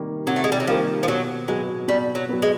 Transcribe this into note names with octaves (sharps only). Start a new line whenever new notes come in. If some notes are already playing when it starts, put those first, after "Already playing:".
Already playing: C3 D#3 G3 A#3
C3 F#3
A3
G#3
G3
F#3
D#3 F3 G3 A#3
F3
B2 F#3
F#3 G#3 B3
B2 G3
F#3
F#3 B3
G#3